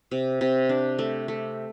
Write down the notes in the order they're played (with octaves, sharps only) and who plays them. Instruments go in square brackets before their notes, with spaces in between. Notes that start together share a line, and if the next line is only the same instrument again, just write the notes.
[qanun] C3
C3
D4
A3
A3